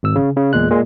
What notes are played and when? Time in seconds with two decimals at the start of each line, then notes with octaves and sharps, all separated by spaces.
0.03 G#1 E6
0.16 C#3
0.36 C#3
0.53 E2 A#2 G#3 F#6
0.70 A#2 G#3